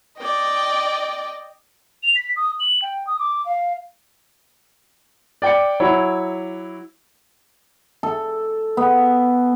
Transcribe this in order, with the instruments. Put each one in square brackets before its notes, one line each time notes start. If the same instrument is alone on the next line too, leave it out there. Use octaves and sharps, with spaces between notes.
[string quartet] D5 D#5 G5
[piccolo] F7
B6
D#6
F#7
G5
D#6
D6
F5
[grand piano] D5 G5 D6 C#7
F#3 E4 C#5
[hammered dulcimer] A4
B3